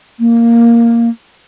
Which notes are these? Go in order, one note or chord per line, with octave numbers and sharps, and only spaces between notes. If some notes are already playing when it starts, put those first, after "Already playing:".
A#3